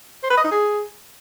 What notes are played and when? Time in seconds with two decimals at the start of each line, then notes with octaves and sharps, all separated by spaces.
0.23 C5
0.30 B4
0.37 D#5
0.44 D#4
0.51 G#4